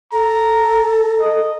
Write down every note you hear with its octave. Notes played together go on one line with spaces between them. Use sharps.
A4 A#5
D#5